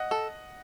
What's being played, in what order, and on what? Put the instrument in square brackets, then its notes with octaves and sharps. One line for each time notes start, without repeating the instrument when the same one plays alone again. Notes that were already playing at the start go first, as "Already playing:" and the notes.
Already playing: [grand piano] D#5 F#5
[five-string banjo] A4